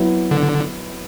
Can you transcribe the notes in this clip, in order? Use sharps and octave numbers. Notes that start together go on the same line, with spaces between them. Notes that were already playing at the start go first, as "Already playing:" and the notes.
Already playing: F#3 B3 E4
D3